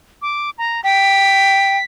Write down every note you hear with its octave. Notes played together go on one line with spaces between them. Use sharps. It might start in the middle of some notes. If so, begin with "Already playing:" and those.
D6
A#5
G5 B6